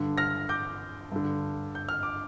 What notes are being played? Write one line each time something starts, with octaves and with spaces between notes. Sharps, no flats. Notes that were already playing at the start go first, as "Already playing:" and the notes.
Already playing: G2 D3
F6 A#6
D6 G6
G2 D3
G6
F6
D6